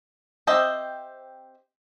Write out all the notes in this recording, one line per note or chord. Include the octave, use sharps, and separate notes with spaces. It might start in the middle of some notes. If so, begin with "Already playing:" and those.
C4 G4 C5 D#5 E5